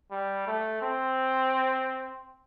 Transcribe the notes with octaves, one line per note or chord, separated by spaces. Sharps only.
G3
A3
C4